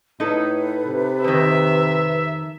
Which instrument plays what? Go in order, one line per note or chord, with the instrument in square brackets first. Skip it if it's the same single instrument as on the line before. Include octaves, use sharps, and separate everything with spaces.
[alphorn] A2 [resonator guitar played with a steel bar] D#4 E4 A4 [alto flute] B4
[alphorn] C3
[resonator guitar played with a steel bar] F2 D#3 [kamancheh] E5